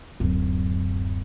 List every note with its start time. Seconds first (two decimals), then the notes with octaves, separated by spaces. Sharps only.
0.20 D1 F#2